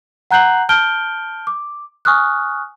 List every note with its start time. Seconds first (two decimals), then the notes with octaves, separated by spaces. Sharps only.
0.31 F#5 A#5 F#6 G6 C7 F#7
0.69 A5 F6 G6 D7 G7
1.47 D6
2.05 G#5 C#6 D#6 F6 F#6